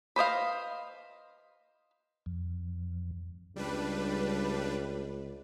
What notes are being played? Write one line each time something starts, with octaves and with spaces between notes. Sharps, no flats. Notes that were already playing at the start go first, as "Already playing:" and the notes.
B4 C5 D#5 F5
F2
C#2 G3 D4 B4